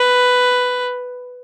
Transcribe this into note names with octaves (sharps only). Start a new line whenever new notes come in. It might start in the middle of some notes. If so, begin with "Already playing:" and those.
Already playing: B4